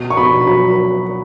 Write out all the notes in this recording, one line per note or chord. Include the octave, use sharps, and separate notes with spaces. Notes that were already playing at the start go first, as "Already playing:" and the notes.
Already playing: B2
C#6
B2 B5
F#3 B5